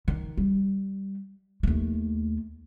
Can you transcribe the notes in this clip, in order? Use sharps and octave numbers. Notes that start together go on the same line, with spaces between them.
D#3
G3
D#2 A3